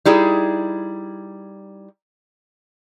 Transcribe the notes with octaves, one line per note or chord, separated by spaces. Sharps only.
G3 D#4 E4 G#4